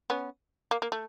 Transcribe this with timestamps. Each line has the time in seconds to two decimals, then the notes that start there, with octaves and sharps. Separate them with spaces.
0.10 B3 C#4
0.71 A#3
0.82 A#3
0.92 A3